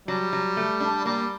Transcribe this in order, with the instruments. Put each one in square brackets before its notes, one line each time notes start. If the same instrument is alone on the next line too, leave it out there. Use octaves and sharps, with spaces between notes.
[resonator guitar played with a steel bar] F#3 [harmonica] G3
[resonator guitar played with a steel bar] F#3
A3
D4
[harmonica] G3 [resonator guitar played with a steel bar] A#3